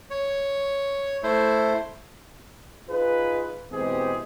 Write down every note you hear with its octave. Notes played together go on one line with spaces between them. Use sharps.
C#5
A3 E4 C5
D#4 F4 G#4 B4
B2 E3 G#3 C4 G4 G#4